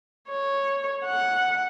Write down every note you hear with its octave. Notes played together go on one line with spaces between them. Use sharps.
C#5
F#5